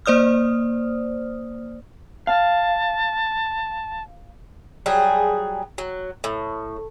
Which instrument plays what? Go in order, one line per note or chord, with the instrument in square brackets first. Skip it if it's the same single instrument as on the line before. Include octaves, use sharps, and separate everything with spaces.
[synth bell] A#3 C5 D5 D#6 F6
[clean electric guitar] F5 [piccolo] A5
[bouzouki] F#3 G3 G#4
F#3
A2